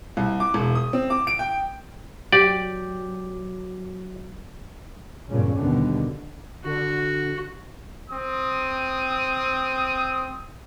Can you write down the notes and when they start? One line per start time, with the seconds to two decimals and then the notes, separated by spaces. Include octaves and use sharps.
0.17 C2
0.40 D6
0.54 E1
0.75 D#6
0.93 C4
1.10 D6
1.27 D7
1.39 G5
2.32 F#3 G4 D5
5.29 E2 G2 A#2 C#3 C#4
5.58 D#2 B2 D3 D#3 G3 B3
6.65 D3 F#4
8.10 C4 D#6